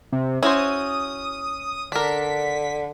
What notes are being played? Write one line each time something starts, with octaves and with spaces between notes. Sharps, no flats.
C3
C#4 E4 F#4 C5 D#6
D3 D4 A#4 B6